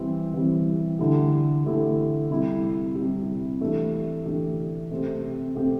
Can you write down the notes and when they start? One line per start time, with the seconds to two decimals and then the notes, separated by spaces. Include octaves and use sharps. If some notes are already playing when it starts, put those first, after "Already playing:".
Already playing: E3 G3 C4
0.34 E3 G3 C4
0.99 D3 A3 E4 G4
1.64 D3 A3 E4 G4
2.30 C3 G3 E4 G4
2.95 C3 G3 E4 G4
3.61 E3 A3 D4 G4
4.25 E3 A3 D4 G4
4.91 C3 A3 C4 G4
5.56 C3 A3 C4 G4